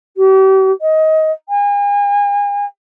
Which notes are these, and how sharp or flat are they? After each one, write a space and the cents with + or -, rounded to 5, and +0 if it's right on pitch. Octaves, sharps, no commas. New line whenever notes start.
G4 -40
D#5 +20
G#5 -40